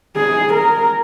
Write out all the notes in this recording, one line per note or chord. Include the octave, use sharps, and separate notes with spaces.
G#4
A#4